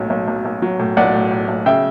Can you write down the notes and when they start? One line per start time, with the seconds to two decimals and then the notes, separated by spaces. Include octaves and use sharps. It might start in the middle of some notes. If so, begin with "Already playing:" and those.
Already playing: B1 A2 F#3
0.10 B1
0.28 B1
0.45 B1
0.62 F#3
0.79 A2
0.97 B1 D5 F#5
1.14 A2
1.31 A2
1.48 B1
1.66 C#3 E5 G5